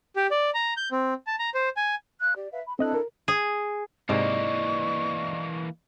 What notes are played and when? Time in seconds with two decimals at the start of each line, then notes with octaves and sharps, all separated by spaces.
0.16 G4
0.31 D5
0.54 A#5
0.77 G6
0.92 C4
1.27 A5
1.39 A#5
1.55 C5
1.77 G#5
2.20 F5 F#6
2.35 G4 D5
2.51 B4 E5 F5
2.66 B5
2.79 C4 D4 E4 A4 D#5 F#6
2.94 A#4
3.28 G#4
4.09 G#2 C3 E3 A#3 D5 D#5 C#6